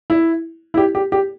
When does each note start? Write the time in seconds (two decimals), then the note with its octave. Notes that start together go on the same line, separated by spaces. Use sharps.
0.10 E4
0.74 E4
0.78 G4
0.95 G4
1.12 G4